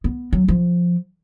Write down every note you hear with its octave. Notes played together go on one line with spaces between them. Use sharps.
B3
F#3
F3